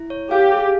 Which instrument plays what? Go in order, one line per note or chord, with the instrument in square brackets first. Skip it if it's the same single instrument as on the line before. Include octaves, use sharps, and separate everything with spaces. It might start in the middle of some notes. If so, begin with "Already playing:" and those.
Already playing: [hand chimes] E4
C#5
[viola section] G4 [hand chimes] F5
[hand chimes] G#4